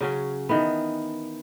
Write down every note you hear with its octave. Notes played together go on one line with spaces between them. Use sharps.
C#3 F#3 C#4
D#3 E3 B3